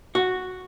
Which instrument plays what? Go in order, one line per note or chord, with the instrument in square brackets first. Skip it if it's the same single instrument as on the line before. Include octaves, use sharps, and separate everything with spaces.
[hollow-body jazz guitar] F#4